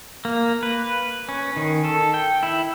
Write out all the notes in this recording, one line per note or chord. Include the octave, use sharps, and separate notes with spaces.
A#3
B4
C#4
D#3
A4
G5
E4